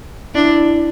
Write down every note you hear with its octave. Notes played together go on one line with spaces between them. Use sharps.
D4 E4